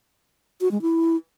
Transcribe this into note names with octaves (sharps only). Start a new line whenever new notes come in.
F#4
G#3
E4